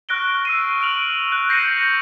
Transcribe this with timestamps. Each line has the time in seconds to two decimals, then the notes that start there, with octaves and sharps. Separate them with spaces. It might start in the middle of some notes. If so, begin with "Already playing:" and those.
0.09 C#6 F6 F#6 A#6 D7 G7
0.45 E6 C7 D#7
0.81 F6 D7 F7 F#7
1.32 F#6
1.49 G6 A#6 C7 C#7 D#7
1.67 G6